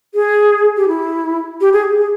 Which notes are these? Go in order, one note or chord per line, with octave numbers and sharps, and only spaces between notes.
G#4
G4
E4
G4
G#4
G#4